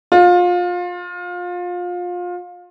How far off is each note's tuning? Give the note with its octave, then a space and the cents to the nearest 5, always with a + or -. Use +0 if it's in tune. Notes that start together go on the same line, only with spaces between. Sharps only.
F4 +25